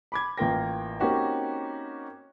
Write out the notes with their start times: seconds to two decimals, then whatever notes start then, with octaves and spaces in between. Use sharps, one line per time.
0.12 B5 D6 G#6
0.38 A1 A#3 F4 A#4 G5 A#6
1.00 A#3 C4 C#4 D#4 F#4 G4